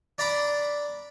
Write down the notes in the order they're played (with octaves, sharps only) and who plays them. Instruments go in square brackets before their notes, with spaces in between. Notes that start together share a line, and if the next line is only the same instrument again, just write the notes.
[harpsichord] D4 D5 A#5 B5 D6